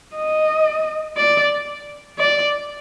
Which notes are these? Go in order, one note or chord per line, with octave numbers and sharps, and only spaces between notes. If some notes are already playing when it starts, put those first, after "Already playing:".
D#5
D5
D5